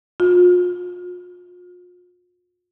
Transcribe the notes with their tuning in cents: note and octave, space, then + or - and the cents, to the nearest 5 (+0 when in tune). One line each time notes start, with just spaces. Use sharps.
F4 +40